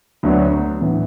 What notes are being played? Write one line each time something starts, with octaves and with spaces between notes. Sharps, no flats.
D2 D3 F#3 B3 D4
A2 E3 B3